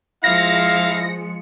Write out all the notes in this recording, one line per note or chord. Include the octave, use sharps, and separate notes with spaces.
F3 G#3 E4 F5 A#6 C#7